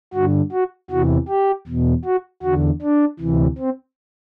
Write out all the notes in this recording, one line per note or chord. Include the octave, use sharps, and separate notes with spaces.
G2 D3 F#4
F#4
E2 C3 E3 F#4
G4
E2 B2
F#4
E2 D3 F#4
D4
D2 C3 E3
C4